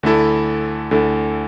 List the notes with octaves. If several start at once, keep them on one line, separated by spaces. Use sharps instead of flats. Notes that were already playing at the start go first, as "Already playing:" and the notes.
D2 D3 A3 E4 A4
D2 D3 A3 E4 A4